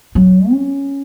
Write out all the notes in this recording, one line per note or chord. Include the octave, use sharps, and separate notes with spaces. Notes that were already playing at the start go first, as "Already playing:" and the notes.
F#3
C#4